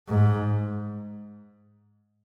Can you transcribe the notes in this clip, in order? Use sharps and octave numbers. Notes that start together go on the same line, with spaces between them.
G#2